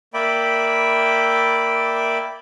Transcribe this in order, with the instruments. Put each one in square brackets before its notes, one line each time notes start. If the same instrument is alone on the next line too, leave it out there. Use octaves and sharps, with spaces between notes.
[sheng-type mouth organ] A#3 D5 E5 G5 B5